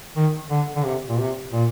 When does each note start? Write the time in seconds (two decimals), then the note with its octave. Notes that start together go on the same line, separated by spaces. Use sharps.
0.16 D#3
0.50 D3
0.76 D3
0.85 C3
1.08 A#2
1.19 C3
1.53 A#2